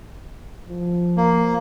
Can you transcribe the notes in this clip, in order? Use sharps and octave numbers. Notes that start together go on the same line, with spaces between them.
F3
A#3